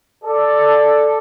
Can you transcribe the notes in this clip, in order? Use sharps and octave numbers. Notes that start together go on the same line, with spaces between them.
A4 D5